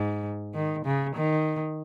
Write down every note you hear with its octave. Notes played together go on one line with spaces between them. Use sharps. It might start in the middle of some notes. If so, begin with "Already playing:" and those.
Already playing: G#2
D#3
C#3
D#3